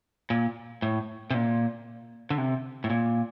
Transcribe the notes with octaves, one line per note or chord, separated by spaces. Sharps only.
A#2
A2
C3
A#2
D3
C3
A2
A#2